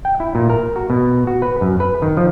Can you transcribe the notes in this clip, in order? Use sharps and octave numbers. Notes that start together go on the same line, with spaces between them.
G5
E4
A#2
A#4
F#4
B2
F#4
B4
F#2
B4
D#3
F3